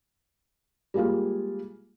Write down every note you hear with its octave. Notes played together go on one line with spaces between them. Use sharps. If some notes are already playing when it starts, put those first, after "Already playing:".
G3 G#3 A#3 F4 G#4